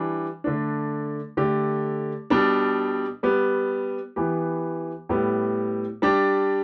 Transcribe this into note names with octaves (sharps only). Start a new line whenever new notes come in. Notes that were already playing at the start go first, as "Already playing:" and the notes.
Already playing: E3 G3 D4
D3 A3 D4
D3 A3 G4
B2 G3 D4
G3 B3 G4
E3 B3 G4
A2 G3 B3 G4
G3 D4 G4